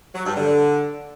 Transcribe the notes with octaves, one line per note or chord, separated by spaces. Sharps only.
F#3
G2
D3